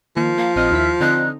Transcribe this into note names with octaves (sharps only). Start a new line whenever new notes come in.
D#3 F3 A#3
A#3 F5
A#1 C4 D#5 F6
D#2 E4 B6
D3 C4 D#4 F#6